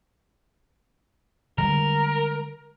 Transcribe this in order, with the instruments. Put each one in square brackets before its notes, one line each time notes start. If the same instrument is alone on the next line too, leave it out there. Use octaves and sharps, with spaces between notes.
[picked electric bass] D3 G3 G#3 [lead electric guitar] A#4